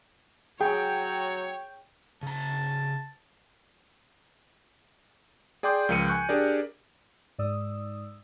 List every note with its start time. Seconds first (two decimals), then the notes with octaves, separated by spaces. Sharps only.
0.61 F#3 G#4 C#5 G5
2.23 C#3 A5 A#5
5.63 G#4 D5 G5 C6 D6 G6
5.89 C#2 F3 A#4 C#7 D#7
6.07 G#5 C#6 F#6 G6
6.29 D4 G4 G#4 A#4 D5
7.38 G#2 D5 D#6 E6